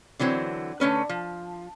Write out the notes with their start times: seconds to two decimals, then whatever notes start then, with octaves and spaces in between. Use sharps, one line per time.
0.19 D3 E3 F#3 C4
0.80 D3 A3 C#4 B4
1.09 F3